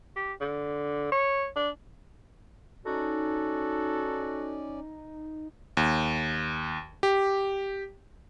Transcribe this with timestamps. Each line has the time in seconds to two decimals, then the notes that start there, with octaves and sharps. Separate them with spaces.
0.16 G4
0.40 D3
1.12 C#5
1.56 D4
2.86 C#4 D#4 F#4 A4 D5
5.77 D#2
7.03 G4